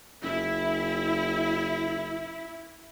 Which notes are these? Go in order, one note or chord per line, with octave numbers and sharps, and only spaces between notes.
F#1 E4